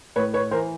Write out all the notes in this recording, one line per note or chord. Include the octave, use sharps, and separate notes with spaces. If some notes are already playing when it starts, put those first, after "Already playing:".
A2 B4 C#5
B4 C#5
E3 A#4 C5